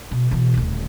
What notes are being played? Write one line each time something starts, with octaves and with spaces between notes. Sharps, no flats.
B2
B2 E3
D#1 D2